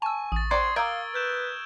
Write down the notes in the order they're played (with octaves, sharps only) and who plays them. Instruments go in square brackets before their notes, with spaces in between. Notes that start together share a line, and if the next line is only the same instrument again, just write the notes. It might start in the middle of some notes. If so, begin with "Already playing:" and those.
[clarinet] G#5 [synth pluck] A5 E6 [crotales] C#6
[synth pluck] A1 [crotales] D#6 A6
[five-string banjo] C4 D5 F#5 [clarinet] C6 [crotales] G#6
[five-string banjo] A#4 G5 [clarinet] F5 [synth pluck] D6 G#6 [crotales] E6 D7 G7
[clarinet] B4 [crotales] F6 G6 E7